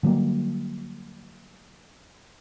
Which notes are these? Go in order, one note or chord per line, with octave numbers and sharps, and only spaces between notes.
D3 F#3 G3 A#3